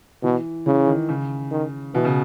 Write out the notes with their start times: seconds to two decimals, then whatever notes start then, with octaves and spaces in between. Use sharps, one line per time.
0.23 B2 E3
0.67 C#3 E3
0.87 D#3
1.09 C#3
1.51 D#3
1.94 B2 E3
2.05 C#3